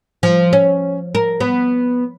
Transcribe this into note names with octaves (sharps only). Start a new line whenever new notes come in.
F3
C#4
A#4
B3